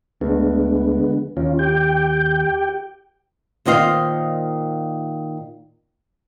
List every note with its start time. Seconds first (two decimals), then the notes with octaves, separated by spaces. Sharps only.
0.21 D2 D3 G#3 B3
1.37 D#2 C#4 F4
1.59 G4 G5
3.65 A#2 D#3 C5 D#5 F5